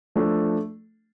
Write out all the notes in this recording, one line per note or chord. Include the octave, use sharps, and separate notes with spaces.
F3 A3 D4 A4